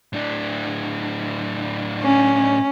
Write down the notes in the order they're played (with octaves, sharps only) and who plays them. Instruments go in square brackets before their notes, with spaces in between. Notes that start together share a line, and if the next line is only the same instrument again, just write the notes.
[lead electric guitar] A2 D4
[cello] C#4